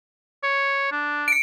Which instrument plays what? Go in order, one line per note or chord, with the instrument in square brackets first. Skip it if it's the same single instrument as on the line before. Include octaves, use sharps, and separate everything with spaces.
[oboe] C#5
D4
[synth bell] C#7 D7